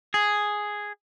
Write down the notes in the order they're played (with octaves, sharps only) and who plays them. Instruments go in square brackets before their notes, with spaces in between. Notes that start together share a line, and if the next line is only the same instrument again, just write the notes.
[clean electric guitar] G#4